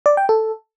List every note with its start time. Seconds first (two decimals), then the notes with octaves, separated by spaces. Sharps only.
0.06 D5
0.17 G5
0.29 A4